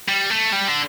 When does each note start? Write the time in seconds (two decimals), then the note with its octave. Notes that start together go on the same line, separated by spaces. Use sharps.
0.09 G3
0.30 A3
0.52 G3
0.68 D3